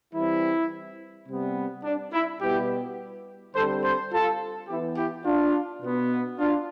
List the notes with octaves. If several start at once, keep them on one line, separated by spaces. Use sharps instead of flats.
E3 G3 C4 E4
C3 G3 B3
D4
E4
B2 G3 B3 E4 G4
D3 G3 C4 A4 C5
A4 C5
F4 A4
E3 B3 E4 G4
E4 G4
D4 F4
B2 B3
D4 F4